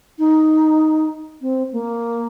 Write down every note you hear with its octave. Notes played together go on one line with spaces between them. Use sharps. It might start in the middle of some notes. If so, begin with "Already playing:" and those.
D#4
C4
A#3